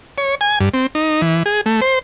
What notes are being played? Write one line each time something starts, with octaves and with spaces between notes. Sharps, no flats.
C#5
G#5
G2
C4
D#4
E3
G#4
A3
C5